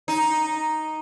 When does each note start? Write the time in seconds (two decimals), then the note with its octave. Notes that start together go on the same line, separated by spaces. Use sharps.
0.08 D#4